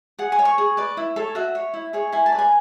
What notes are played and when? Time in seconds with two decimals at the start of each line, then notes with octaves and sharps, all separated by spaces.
0.19 G#4 F#5
0.32 G#5
0.39 C#5
0.45 C#6
0.58 G#4
0.77 B4 D5
0.97 E4
1.16 A4 C#5
1.35 F#4 E5
1.55 C#5
1.74 E4
1.93 G#4 C#5
2.12 E4 G#5
2.26 A5
2.32 D5
2.35 B4 G#5